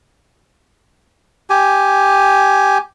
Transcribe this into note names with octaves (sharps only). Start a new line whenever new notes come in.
G4 G#5